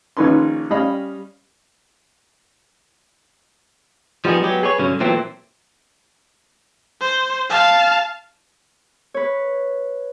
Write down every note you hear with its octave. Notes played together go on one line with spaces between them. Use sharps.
A#1 D#3 C#4 D#4 B4 C6
G3 C#4 D#5 F5 B5
F3 G3 B3 D#4 G#4
F#3 G#3 B3 G4
G#4 B4 C#5
C2 G2 D3 F#3 C#4
A#2 E3 F#3 A3 C4
C5
F5 A5
B4 C#5